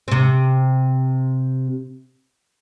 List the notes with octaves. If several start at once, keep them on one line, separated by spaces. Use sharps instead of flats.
C3 C4